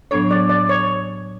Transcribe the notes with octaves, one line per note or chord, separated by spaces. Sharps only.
A2 F#3 B3 D4 A4 C#5
D5
D5
C#5